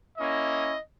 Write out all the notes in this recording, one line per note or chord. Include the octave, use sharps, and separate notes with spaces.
A#3 C#4 E4 D#5